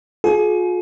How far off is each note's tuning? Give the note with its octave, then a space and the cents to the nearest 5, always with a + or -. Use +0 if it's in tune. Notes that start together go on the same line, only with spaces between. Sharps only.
F4 +45 G#4 +35